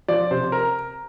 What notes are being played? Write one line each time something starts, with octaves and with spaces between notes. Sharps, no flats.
F3 D5
C3 C5
A#4